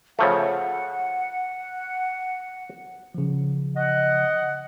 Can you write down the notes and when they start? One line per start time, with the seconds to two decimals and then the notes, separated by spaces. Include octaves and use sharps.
0.19 C#3 F3 A3 F#5
3.14 C#3 F3
3.77 D#5 F#5